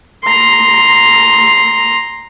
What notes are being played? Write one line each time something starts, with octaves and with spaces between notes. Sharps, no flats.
A#5 C6